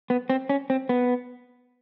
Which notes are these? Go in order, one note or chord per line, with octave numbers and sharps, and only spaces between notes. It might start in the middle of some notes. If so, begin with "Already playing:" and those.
B3
C4
C#4
C4
B3